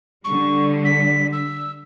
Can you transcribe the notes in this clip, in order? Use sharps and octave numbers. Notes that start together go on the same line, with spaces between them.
D3 G3 C#6
B6
E6